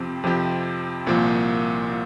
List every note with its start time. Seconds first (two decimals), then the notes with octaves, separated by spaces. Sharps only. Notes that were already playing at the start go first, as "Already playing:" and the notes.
Already playing: F2 C3 F3 C4 G4
0.23 F2 C3 F3 C4 G4
1.06 C2 A#2 F3 A#3
1.90 A#2